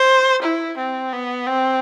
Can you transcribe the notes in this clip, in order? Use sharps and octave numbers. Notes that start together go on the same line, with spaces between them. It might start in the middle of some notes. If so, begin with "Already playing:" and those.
Already playing: C5
E4
C4
B3
C4